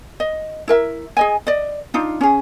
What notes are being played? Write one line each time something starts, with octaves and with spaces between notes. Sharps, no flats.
D#5
E4 A#4 E5
G#4 D#5 G#5
D5 D#5
D4 D#4 F4
C#4 G#4